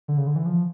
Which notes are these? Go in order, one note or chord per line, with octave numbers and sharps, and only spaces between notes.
D3
C#3
D3
E3
F3